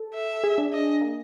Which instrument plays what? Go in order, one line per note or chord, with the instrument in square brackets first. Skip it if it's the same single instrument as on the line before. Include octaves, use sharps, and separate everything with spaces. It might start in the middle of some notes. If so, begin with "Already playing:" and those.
Already playing: [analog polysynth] A4
[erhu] E5
[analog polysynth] G#4
D4
[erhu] D#5
[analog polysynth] A#3